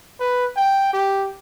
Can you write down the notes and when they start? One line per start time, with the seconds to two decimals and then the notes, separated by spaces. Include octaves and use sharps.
0.20 B4
0.56 G5
0.93 G4